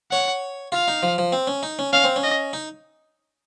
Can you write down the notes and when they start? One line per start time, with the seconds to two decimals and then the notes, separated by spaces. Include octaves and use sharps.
0.11 C#5 F#5
0.72 F4 F5
0.88 D#4
1.03 F3
1.18 F3
1.32 C4
1.47 C#4
1.63 D#4
1.79 C#4
1.93 C#4 F5
2.04 C4
2.16 C#4
2.23 D#5
2.53 D#4